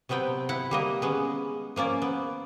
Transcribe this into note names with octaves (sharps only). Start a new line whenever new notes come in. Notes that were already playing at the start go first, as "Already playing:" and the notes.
C3 F#3 B3 C4 G5
E4 F#5
G3 A#3 D#5
G#3 B3 C#4
F3 A#3 C#4 D5
B3